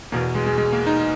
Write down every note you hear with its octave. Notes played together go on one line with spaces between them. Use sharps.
E2 B2 A#3
G#3
G#3
G#3
A#3
D#4